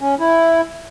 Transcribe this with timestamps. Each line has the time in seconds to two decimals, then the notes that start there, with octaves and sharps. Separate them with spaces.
0.01 C#4
0.20 E4